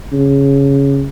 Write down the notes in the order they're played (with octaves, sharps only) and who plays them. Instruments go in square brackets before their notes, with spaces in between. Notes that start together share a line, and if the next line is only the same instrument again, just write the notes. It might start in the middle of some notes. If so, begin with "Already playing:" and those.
[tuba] C#3